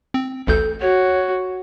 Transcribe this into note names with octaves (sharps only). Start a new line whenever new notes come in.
C4
A1 D2 A4 G6
F#4 C#5